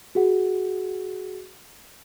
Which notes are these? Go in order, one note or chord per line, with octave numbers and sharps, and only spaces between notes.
F#4 G#4 F#5